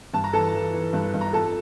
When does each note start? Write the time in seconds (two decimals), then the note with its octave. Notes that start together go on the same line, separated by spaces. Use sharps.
0.13 G2 A5
0.24 A#5
0.33 E3 A4 A5
0.54 E3
0.73 E3
0.93 G2
1.14 G2
1.21 A#5
1.33 F2 A4 A5